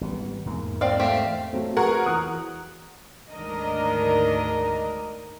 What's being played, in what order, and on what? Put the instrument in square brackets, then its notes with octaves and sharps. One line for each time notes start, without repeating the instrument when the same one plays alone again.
[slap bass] G#1 G3 B3
E2 G#2 A#3
[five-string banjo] C4 D5 F5
[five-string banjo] A3 C4 G4 [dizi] F5
[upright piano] F#3 A3 C4
[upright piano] F#4 B4 C#6 [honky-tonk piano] G#4 A#4 F#5
[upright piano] E2 D#6 F#6
[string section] D2 G#2 D#3 D4 A#4 D#5